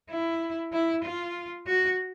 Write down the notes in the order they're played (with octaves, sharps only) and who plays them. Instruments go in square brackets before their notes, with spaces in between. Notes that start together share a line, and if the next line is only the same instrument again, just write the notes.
[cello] E4
E4
F4
F#4